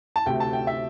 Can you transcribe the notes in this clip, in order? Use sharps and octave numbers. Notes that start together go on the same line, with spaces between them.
A5
D2 C3 A3 G5
A5
G5
E5